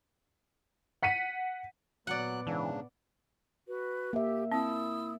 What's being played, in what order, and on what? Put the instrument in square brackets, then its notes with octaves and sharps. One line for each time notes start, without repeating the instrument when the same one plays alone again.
[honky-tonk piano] F#5 B6 C#7 D#7
[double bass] A#2 B3 [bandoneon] F#3 F#6 [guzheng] D5 F#5
[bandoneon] G#2 C#3 D4 [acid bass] E3
[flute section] F#4 B4
[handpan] A#3 E5 [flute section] G4
[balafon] C4 [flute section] E4 D#6 E6